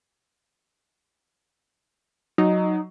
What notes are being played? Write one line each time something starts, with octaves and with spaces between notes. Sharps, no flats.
F#3 D#4